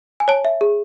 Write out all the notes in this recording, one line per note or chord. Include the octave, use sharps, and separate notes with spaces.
G#5
C#5 A5
E5
G#4